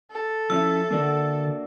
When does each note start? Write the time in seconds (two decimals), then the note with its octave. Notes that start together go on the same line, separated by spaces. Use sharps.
0.11 A4
0.50 F3 C#4 E4 E6
0.91 D3 A#3 D4 F#4